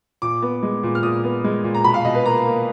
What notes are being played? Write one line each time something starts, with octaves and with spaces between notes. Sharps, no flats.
A#2 D6
B3
G#3
A#2
F6
A#2 D#6
B3
G#3
A#2
A#5
B2 B5
F5
B2 D#5
B4
A#3 A#5
A#3